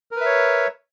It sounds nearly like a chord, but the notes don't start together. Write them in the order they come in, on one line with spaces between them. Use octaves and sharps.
A#4 B4 E5 C#5